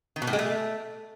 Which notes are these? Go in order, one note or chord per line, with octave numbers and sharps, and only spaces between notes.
D#3
B2
A2
G#3
A3